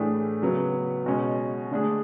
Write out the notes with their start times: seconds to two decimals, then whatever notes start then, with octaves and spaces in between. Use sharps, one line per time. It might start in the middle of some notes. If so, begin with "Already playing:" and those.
Already playing: A2 E3 A3 D4 G#4
0.42 C#3 F#3 B3
1.06 B2 G#3 C#4
1.71 D3 A3 D4 G#4